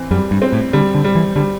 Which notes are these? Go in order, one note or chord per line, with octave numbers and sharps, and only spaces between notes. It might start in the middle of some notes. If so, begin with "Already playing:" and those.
Already playing: E3 C4
F#2 G3
G2
C4
A2
D3 G3
D3
G3
E3
D3 G3